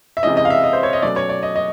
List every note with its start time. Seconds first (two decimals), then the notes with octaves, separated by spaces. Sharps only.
0.17 E5
0.23 C3 E3 G#3 C#4 D#5
0.37 D#5
0.45 F5
0.50 E5
0.64 D#5
0.73 C5
0.83 C#5
0.93 D#5
1.02 B2 F#3 A3 C#4 D5
1.16 C#5
1.29 D5
1.43 D#5
1.56 D#5